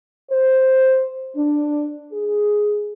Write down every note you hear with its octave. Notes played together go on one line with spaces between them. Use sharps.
C5
D4
G#4